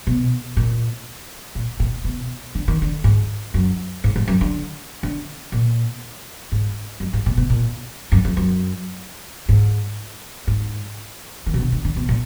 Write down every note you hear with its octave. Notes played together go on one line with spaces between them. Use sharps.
B2
A#2
A#2
A#2
B2
D3
D#3
D3
G#2
F#2
G#2
G#2
F#2
D3
D3
A#2
G#2
F#2
G#2
A#2
B2
A#2
F#2
F2
F#2
G#2
G#2
D#3
B2
D3
D3
D3
B2
A#2